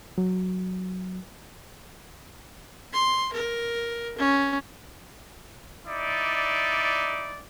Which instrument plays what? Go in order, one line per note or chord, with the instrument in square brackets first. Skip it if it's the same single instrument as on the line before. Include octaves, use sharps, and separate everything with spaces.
[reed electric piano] F#3
[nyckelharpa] C6
A#4
C#4
[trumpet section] D#4 E4 D5